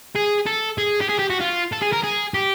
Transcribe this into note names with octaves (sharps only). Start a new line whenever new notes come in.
G#4
A4
G#4
G4
G#4
G4
F#4
F4
A4
G#4
A#4
G#4
G4